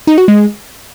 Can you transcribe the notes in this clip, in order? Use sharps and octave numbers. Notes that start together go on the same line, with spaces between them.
D#4
F#4
G#3